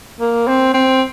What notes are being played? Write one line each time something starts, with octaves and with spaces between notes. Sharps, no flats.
A#3
C4
C4